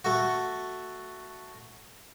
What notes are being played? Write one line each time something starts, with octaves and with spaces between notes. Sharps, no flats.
A3 F#4